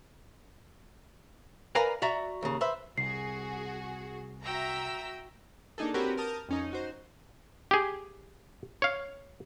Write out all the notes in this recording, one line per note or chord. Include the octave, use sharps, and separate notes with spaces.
A#4 B4 D5 F5 G#5 A#5
F#4 D5 E5 A#5
D#2 C#3
B4 C5 E5
C2 F#4 G#4 C7
F#4 E5 G5 A#5 E6
A#3 D4 D#4 G#4 A4
C4 F#4 G4 A#4 B4 C#5
A#4 A5 D#6 F6 G6
F2 C#4 D#4
D#4 F#4 C5
G4 G#4
C#5 F5